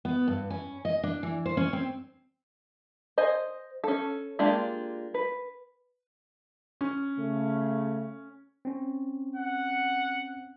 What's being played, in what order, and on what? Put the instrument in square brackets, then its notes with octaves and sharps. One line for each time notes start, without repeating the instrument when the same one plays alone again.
[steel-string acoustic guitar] B3
G2
C#4
D#5
D4
E3
C5
C#4
C4
[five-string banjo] C5 D#5 G#5
C#4 A4
G#3 A#3 D4 F4 G4
B4
[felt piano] C#4
[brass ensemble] C#3 A3
[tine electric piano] C4 C#4
[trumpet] F#5